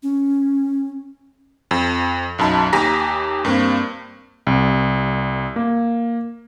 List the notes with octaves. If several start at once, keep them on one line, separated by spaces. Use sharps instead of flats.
C#4
F2
B1 F#2 D#4 A5 B5
D#2 G4 G#5 A#5 A#6 B6
G2 A#3 C4
C2
A#3